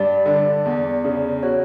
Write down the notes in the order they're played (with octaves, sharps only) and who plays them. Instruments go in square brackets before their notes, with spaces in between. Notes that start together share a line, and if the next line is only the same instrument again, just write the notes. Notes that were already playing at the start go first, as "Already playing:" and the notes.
Already playing: [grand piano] G2 [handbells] D5
[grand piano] D3
E2
C#3
[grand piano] F#4 [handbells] C#5